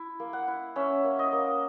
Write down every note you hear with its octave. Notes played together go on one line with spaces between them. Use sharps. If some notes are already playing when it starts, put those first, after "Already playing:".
Already playing: E4
A#3
F#5
E4
C#4 E5
A#3
D#5
A#3